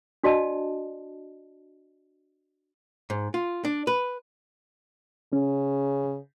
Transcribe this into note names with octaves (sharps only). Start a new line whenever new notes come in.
D4 F#4 D5 D#5 A5
G#2
F4
D4
B4
C#3 C#4